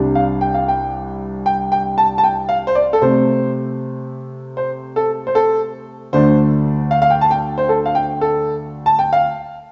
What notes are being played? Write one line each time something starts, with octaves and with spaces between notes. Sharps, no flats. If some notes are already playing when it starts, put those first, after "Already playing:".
Already playing: C2 C3 G3 D4
F5
G5
F5
G5
G5
G5
A5
A5
G5
F5
C5
D5
A4
C3 A3 C4 C5
C5
A4
C5
A4
D2 D3 A3 D4 C5
F5
F5
G5
A5
G5
C5
A4
F5
G5
A4
A5
G5
F5